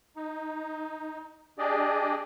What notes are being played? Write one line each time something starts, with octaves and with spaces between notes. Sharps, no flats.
D#4
D4 G4 G#4 D5 D#5